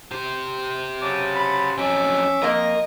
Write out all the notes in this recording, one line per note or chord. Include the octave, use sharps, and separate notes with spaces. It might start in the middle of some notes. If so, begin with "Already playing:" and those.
G4 C5
C#3 F#3 A5 D6
B5
F2 F#3 C#4 E5 D6
F2 A#3 A#4 D#5